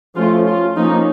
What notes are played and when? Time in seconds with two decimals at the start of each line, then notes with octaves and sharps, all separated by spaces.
0.16 F3 A3 C#4 F4
0.46 F4
0.76 F3 A#3 C#4 D#4